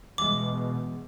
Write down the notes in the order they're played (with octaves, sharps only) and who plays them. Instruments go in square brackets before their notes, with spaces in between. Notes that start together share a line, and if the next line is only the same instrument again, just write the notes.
[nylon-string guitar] E2 G#3 [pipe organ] B2 [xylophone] D6